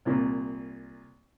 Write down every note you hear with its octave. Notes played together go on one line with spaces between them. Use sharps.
C2 A#2